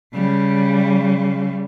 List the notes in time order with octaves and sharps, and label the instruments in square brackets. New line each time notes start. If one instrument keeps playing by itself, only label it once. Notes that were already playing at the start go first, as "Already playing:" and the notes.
[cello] C#3 G3